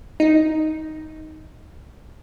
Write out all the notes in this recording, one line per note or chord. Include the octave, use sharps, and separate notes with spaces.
D#4